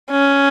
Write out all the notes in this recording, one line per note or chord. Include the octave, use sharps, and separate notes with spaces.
C#4